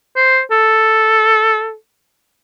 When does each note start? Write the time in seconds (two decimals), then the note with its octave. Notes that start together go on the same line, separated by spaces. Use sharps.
0.16 C5
0.51 A4